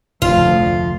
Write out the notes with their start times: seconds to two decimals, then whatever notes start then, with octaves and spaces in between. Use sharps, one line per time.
0.22 F1 D2 F3 F4